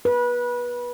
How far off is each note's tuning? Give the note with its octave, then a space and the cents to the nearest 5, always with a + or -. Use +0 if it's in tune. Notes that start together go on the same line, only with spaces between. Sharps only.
B4 -25